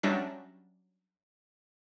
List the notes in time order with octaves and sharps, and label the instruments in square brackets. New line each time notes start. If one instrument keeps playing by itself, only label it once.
[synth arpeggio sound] F#3 G3 C#4 D4 E5 A#6